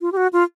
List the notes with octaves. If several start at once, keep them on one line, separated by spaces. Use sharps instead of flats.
F4
G4
F#4
F4